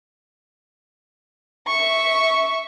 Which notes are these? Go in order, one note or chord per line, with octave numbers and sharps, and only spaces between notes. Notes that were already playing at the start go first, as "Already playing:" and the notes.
E5 C#6